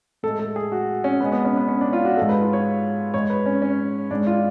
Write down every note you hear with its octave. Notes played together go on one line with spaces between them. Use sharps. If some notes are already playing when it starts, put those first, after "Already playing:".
A2 G#3 A4
A4
G#4
F#4
C#4
B2 G#3 B3
B3
C#4
B3
C#4
D4
F4
F#4
G#2 G#3 A4
B4
F4
C#5
G#2 G#3 C#5
B4
C#4
C#4
G#2 G#3 D4
F4